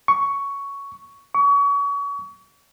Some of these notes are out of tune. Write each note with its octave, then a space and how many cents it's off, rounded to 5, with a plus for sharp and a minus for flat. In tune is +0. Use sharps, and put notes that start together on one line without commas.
C#6 +10
C#6 +35